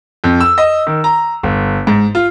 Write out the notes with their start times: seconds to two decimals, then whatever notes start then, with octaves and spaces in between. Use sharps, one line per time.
0.24 F2
0.40 E6
0.58 D#5
0.87 D#3
1.04 A#5
1.43 G1
1.87 G#2
2.15 F4